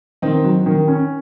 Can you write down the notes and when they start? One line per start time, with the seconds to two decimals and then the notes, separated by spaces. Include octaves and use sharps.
0.22 D#3 C4 D#4
0.44 F#3
0.66 D#3
0.88 C#4